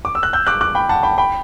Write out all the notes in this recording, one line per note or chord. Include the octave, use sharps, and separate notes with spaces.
D6
E6
F#6
E6 G6
D6 F#6
D6 F#6
G5 B5
F#5 A5
G5 B5
G5 B5